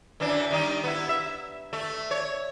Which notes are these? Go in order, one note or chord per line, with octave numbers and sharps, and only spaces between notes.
F#2 E3 D4
D#3 G3 D#4
B3 E4
E5
A3
C#5